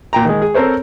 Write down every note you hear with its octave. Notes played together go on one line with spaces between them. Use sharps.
A#2 G5 A#5
D#3 G#3
G#4
C4 A4 A#4 C5 C#5